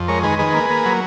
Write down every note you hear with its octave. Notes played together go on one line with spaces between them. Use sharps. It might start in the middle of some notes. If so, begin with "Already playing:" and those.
Already playing: F2
G#3 A#4 C#5
D#3 G#4 B4
D#3 G#4 B4
A#3
A#3
F#3